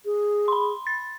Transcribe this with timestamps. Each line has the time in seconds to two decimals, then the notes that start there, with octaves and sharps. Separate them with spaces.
0.05 G#4
0.48 B5 C6
0.87 A6